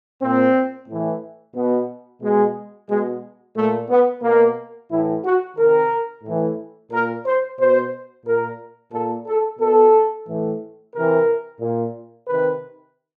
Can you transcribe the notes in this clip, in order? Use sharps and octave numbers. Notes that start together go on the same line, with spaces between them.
A#2 C4
A2 E3
B2 B3
B2 G#3
B2 G#3
A#2 A3
B3
B2 A#3
A2 E3 E4
F#4
C3 D#3 A#4
A2 E3
A#2 A#4
C5
B2 C5
A#2 A#4
A#2 A4
A4
B2 A4
A2 E3
C3 E3 A#4
A#2
C3 D#3 B4